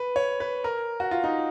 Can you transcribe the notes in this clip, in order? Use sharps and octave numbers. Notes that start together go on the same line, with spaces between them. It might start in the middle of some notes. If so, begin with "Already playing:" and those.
Already playing: B4
C#5
B4
A#4
F#4
F4
D#4